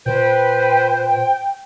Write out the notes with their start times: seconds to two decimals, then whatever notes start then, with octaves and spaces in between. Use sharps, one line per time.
0.06 A#2 B4 C5 G5